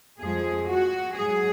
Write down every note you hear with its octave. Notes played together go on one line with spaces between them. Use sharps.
F2 F3 G#3 G#4
F#4
G#2 F#3 G#4